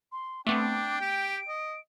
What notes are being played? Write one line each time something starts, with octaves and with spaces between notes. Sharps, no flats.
C6
A3 B3 C4 D4 G5 D6
G4 D7
D#5